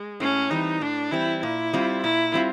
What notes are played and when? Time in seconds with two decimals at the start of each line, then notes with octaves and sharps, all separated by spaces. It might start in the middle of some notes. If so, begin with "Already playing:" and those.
Already playing: G#3
0.20 A2 C#4
0.50 E3 G3 C4 D#4
0.81 A2 D4
1.11 E3 G3 C4 E4
1.43 A#2 E4
1.73 G3 C4 F4
2.03 A#2 E4
2.34 G3 C4 F4